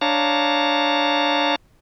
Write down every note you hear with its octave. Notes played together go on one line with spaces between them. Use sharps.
D4 C#5 F5 A5 A#5